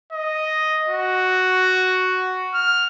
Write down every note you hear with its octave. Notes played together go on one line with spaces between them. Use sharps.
D#5
F#4
F6